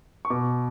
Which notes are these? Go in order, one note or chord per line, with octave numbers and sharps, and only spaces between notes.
C#6
B2 D6